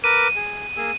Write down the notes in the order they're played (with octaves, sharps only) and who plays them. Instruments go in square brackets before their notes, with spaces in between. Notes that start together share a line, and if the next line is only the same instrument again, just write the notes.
[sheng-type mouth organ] A#4 B4 D6 [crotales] D#7
[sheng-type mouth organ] G#4
A#3 G#4 E6